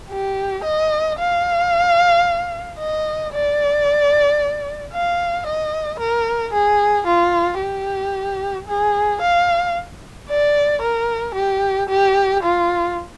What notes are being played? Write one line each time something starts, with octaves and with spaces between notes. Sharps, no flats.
G4
D#5
F5
D#5
D5
F5
D#5
A#4
G#4
F4
G4
G#4
F5
D5
A#4
G4
G4
F4